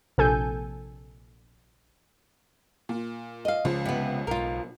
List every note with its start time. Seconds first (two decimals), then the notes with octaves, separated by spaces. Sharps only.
0.18 A#1 C3 A4 G#5 G6
2.89 A#2
3.45 D#5 F5
3.65 C#2 C#3 F3 G#3 F4
3.85 C3 B3
4.27 B1 F4 A#4